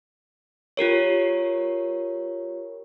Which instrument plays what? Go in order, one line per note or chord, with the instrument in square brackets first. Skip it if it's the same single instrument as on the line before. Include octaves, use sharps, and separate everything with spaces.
[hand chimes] F4 G4 A#4 C#5